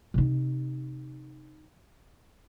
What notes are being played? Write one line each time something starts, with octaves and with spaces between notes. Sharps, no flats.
C3 D#4